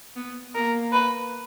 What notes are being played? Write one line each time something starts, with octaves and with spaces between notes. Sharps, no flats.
B3
A#3 A#4
B4